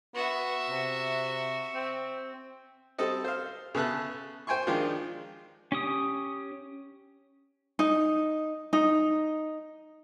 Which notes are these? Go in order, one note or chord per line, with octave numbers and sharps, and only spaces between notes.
B3 F#4 E5
C3
C4
G3 C4 A4 D#5
C5 F5
C#3 B3 A4 E5 A5 F#6
C5 G5 G#5 C6 C#6
D#3 F3 G#3 D4 F4
C#4 G4 D#6
D#4
D#4